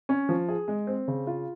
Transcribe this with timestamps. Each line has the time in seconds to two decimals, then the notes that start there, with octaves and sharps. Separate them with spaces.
0.09 C#4
0.29 F3
0.49 G#4
0.68 G#3
0.87 C4
1.08 C#3
1.27 F4